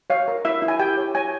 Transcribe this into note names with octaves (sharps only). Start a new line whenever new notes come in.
C#5 F5
A#4
E4 E5
E4
G#5
G4 G5
C#5
C#5 G#5